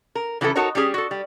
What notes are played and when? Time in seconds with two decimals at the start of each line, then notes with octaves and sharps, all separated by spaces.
0.15 A#4
0.41 C#3 E3 F#3 E4 F#4 A4
0.56 D#4 F#4 A4 A#4 C#5
0.75 G3 C#4 G4 G#4
0.94 F#4 A4
1.11 G3